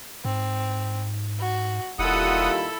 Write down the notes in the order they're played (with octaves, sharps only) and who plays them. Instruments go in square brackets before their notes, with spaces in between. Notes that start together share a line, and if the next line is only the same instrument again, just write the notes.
[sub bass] G#2 [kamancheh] C4
[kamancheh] F#4
[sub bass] E1 [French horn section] D#2 G3 F4 [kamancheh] E4 A4 [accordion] F#5 D#6